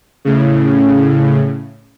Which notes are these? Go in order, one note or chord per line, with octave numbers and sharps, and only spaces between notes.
A2 C#3